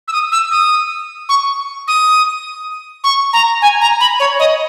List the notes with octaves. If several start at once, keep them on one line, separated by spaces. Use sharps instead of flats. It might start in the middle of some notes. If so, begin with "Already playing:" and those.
E6
D#6
E6
D#6
C#6
D#6
C#6
A#5
G#5
A#5
B5
C#5
D#5